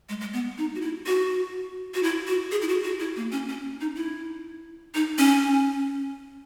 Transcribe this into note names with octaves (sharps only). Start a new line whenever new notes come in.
G#3
G#3
B3
D#4
F#4
E4
F#4
F#4
E4
F#4
G#4
E4
F#4
F#4
E4
A#3
C#4
C#4
D#4
E4
D#4
C#4